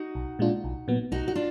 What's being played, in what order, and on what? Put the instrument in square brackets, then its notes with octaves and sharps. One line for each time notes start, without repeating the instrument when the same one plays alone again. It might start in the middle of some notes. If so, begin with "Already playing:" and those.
Already playing: [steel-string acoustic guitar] D#4 F#4
[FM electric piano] B1
A#2 G#3 D4 F4
B1
A#2 F#3 B3
[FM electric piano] B1 [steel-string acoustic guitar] D#4 F#4
[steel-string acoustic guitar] F#4
D4 F4